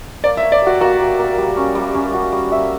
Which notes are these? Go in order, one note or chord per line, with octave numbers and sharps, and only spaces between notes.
A#3 D5
E5
C#5
D5
F#4 G4
A#3 F#4
G4
A#3
G3
C#4
G3
C#4
F#4
G3
E5